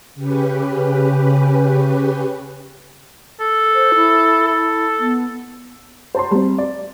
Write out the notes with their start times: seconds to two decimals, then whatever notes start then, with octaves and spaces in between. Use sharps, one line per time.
0.15 C#3 C#4 G4 B4
3.40 A4
3.75 C5
3.96 E4
4.47 A4
4.99 B3
6.15 C5 C#5 A5 A#5 C6
6.31 G3 C4
6.58 D5